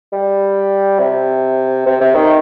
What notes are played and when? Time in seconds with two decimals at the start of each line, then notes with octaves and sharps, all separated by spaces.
0.13 G3
0.99 C3
1.86 C3
2.01 C3
2.15 D#3